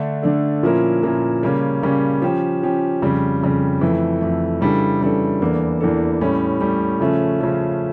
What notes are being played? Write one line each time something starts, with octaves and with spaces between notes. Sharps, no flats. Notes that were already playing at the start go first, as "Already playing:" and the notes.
Already playing: D3 A3 D4 A4
D3 A3 D4 A4
A#2 F3 C#4 E4 A#4
A#2 F3 C#4 E4 A#4
C#3 G3 A#3 C#4
C#3 G3 A#3 C#4
F3 C#4 G4
F3 C#4 G4
F2 C#3 G3
F2 C#3 G3
F2 E3 A3
F2 E3 A3
C#3 E3 G3 D4 A4
C#3 E3 G3 D4 A4
E2 E3 A#3 D4 A4
E2 E3 A#3 D4 A4
A2 G3 C#4
A2 G3 C#4
C#3 F3 A3 C#4
C#3 F3 A3 C#4